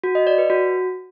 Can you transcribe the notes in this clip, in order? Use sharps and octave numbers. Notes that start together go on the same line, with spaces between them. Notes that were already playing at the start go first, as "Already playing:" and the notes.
F#4
D#5
D5
B4
F#4